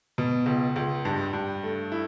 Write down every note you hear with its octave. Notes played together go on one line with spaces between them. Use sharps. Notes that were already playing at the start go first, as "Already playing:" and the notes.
B2
C#2
C#2
G2
G2
A3
E4